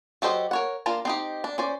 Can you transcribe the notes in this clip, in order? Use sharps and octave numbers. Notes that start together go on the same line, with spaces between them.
F#3 G4 A4 C5 D#5
A#4 C#5 F#5
A#3 D4 F4 A#4 A#5
C4 D#4 G4
D4
C#4 C5 D5